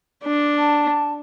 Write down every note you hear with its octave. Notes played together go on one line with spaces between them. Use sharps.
D4
A5